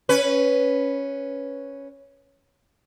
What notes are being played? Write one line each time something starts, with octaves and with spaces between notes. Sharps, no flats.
C#4 B4